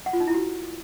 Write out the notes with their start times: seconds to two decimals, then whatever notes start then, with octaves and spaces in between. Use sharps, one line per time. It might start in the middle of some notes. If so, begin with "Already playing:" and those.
0.06 F#5
0.13 F4
0.20 D#4
0.27 E4
0.34 F#4